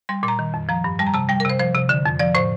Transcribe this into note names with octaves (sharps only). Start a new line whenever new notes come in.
G3 C6
A#2 C6
A#5
D#3
F2
F3 A#5
G2
G3 A5
A#5
C3 A5
G3 G5
A#4
C3 C5
F3 C5
C3
D3
F2
F3 D5
A2 C5